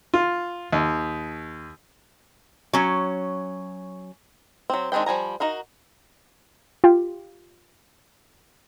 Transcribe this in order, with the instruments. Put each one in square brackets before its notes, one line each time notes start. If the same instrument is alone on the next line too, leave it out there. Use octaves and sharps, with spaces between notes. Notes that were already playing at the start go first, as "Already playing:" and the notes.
[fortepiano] F4
D#2
[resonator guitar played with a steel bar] F#3 C#4
[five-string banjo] F#3 C4
D#3 G#3 C4 D4 G5
F3 G3 G#5 A#5
D#4 F#4 A#4 F5
[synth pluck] F4 G4